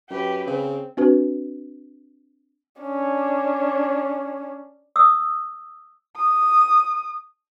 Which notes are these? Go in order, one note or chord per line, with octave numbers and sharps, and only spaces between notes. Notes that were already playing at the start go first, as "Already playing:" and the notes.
F#2 G4 B4
C#3 C4
C4 D4 F#4 B4
C#4 D4
D#6 E6
D#6